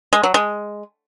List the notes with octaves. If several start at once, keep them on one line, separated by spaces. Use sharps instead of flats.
G#3
F#3
G#3